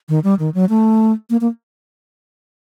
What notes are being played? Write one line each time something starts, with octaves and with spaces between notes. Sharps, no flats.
D#3
G3
D#3
F#3
A3
A#3
A#3